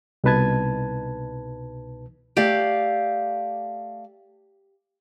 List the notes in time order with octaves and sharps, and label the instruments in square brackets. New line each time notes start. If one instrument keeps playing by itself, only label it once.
[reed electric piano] C2 B2 D#4 B4 A5 G#6
[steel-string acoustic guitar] A3 D5 F5 [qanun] G4